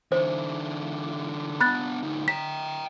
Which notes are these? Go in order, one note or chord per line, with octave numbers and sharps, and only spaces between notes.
D3 E3 C5
B3 D4 B5 F#6 A6
D2 D#4
G5 A#5 B6